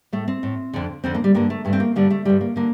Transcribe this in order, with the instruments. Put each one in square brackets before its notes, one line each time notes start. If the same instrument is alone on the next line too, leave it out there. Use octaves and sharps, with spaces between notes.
[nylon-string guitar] A2 A3
C4
A2
F2 D3
F2 D3 C4
A#3
G3
G2 D3 A#3
A3
G2 D3 A3
C4
A#3
G2 D3 G3
A3
G2 D3 G3
A#3
D3 A#3